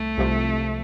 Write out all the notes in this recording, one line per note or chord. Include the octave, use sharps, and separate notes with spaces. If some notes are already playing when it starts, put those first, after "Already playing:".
Already playing: C2 A3
C2 C3 F3